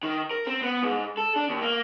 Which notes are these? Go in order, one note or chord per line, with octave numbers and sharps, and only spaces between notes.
D#3
A#4
C4
B3
G#2
A4
D4
D#2
A#3